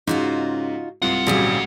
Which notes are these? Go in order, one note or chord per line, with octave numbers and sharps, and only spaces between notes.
G#2 C#3 D#4 F4 F#4
C2 G#2 F4 F#5
G#1 A#2 C#3 F#3 G3 G#4